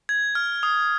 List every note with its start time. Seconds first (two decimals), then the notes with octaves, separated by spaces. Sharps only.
0.09 G#6
0.35 F6
0.63 D#6